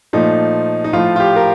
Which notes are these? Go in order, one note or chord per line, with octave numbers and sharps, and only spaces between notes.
A#2 F3 A3 D#4
D#4
A2 F3 A3 F4
F4
G4
A#4